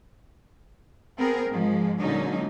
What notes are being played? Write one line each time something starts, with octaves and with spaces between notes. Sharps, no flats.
B3 C4 G#4 A#4
G#2 F3 G#3
A#2 D3 F#3 G#3 C#4 D#4